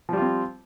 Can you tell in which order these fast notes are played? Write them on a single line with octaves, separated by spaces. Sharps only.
F3 G3 F4 C4